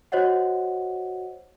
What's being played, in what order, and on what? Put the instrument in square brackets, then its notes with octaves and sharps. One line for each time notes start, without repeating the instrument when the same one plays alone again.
[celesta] F#4 C5 C#5 D#5 F#5